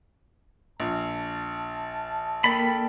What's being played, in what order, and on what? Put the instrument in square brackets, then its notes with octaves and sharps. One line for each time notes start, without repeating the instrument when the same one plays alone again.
[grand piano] A#1 [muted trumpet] A5
[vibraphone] A#3 A#4 G5 [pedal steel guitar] A4 D5 B5